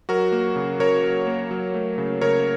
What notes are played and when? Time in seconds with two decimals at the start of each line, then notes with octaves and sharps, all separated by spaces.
0.09 F#3 F#4 A#4
0.32 A#3
0.56 C#3
0.79 C#3 A#4 C#5
1.04 F#3
1.27 A#3
1.51 F#3
1.74 A3
1.98 C#3
2.21 C#3 A#4 C#5